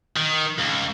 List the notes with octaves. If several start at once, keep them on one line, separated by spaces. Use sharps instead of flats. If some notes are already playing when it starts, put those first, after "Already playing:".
D#3
C#2